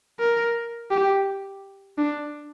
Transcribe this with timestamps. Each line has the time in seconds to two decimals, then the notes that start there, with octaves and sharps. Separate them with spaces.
0.19 A#4
0.91 G4
1.98 D4